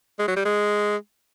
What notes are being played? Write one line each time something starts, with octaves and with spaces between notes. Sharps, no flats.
G#3
F#3
G3
G#3